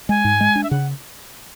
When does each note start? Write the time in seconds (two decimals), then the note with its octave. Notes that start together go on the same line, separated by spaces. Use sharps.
0.09 G#3 G#5
0.25 G#2
0.41 G#3
0.55 D4
0.63 E5
0.70 C#3 F#5